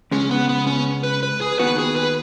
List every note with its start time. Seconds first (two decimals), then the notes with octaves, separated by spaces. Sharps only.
0.11 C#2 C#3 G#3 C#4
0.31 B3
0.49 B3
0.67 C#4
1.03 B4
1.23 B4
1.41 G#4
1.59 D#2 D#3 B3 F#4 B4
1.78 G#4
1.96 B4